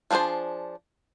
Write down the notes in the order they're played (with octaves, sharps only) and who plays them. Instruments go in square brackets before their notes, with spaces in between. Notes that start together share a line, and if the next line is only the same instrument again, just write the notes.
[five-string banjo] F3 B3 D4 G#4 C5